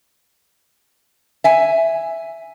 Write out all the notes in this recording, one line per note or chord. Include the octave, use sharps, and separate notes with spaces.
E5 G#5